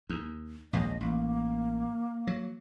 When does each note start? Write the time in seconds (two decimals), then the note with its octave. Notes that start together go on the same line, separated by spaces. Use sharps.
0.09 D#2
0.73 A#1 D#2 G#3 D#5
1.01 A1 A#3
2.27 F#3